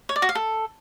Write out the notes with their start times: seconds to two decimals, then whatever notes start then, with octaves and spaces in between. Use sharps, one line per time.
0.09 C#5
0.16 D5
0.22 F#4
0.29 F5
0.35 A4